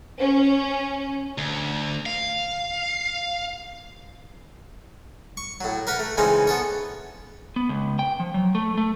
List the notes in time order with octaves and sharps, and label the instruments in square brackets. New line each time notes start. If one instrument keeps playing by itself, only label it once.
[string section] C#4
[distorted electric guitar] D2
F5
[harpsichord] C#6
A2 F#3
A#4 B4 F#5 B5
A3
C#3 E3 G#3 C4 C#4 D#4
B3 A4 C#5
[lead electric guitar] B3
C#2
G5
F3
F#3
A3
A3